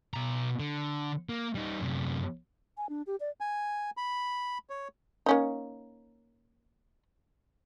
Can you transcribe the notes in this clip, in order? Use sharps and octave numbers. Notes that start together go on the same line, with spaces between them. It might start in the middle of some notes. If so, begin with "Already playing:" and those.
B2 A#5
D3
A#3
G3 D#4
F#2 C3
G#5
D4
G4
D5
G#5
B5
C#5
A#3 C#4 D#4